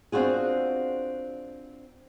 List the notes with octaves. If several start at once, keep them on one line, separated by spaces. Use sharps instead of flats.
C4 D4 F4 F#4 G#4